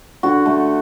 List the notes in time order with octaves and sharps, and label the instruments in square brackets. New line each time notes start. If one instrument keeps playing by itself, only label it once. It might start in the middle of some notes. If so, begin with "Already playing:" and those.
[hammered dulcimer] D3 F#4
A3